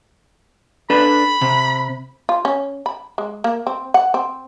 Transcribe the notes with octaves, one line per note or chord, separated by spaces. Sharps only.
D4 A4 B4 B5
C3
F4
C#4
B5
G#3
A#3
C4
F#5
C4